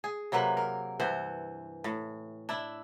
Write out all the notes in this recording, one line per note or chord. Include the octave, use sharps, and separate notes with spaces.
G#4
C3 F#3 A#3 B4
A#4
G2 E3 C5 F#5
A2
D4 E4